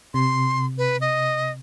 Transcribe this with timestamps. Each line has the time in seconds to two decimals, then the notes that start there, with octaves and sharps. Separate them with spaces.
0.14 C3 C6
0.78 B4
1.01 D#5